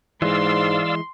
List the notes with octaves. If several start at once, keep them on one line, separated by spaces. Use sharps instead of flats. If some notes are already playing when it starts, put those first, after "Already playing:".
G#2 E3 G#3 D5 F5 C6 E6